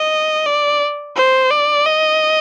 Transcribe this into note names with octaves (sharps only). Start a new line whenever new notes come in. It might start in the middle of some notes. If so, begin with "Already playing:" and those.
Already playing: D#5
D5
C5
D5
D#5